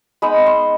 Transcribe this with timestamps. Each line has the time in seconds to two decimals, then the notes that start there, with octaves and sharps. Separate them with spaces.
0.22 G#3 B3 D#4 B5
0.46 C6